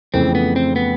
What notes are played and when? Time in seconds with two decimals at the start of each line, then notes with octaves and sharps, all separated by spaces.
0.14 F2 C#3 E3 A3 C4
0.35 B3
0.56 C4
0.76 B3